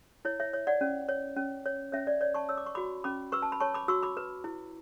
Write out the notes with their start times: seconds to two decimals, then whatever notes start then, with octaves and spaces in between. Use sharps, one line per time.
0.25 E4 C#5
0.40 C#5 E5
0.53 C#5
0.67 D5 F#5
0.81 C#4
1.09 C#5
1.36 C#4
1.66 C#5
1.92 C#4 C#5 E5
2.07 D5
2.21 C#5 D5
2.34 A5 C#6
2.49 C#5 E6
2.57 D6
2.66 C#6
2.75 F#4 B5 D6
3.04 C#4 B5 D6
3.32 B4 C#6 E6
3.42 A5
3.52 B5
3.60 C#5 A5 C#6
3.74 B5 D6
3.88 F#4 C#6 E6
4.03 B5 D6
4.17 B4
4.44 E4